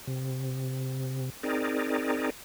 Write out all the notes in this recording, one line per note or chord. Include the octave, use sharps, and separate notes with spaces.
C3
C4 D#4 G#4 A#4 D5